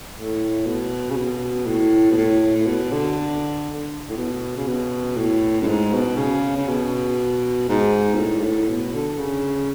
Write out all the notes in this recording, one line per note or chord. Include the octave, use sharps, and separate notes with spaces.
A2
B2
C#3
B2
A2
B2
A2
A2
B2
D3
A2
B2
C#3
B2
A2
F#2
G#2
B2
C#3
C#3
B2
G#2
B2
A2
G#2
A2
B2
D3
C#3